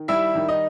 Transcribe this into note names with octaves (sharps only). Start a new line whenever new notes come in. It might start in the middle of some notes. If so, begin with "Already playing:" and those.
Already playing: D#3
G3 E4 E5
D#3
D#4 D#5